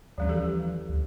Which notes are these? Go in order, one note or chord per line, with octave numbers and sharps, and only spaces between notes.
D#2 F3 G3 C#4
E3 G4 A4
D2